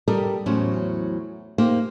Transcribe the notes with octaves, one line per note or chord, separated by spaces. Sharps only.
G3 G4 A4 A#4 D5 D#5
E2 A2 F#3 C#4 C5
A#3 D#4 G4 C5